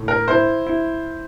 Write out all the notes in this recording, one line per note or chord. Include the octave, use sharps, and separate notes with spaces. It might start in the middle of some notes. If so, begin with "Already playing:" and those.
Already playing: A2
A#4
E4 C5
E4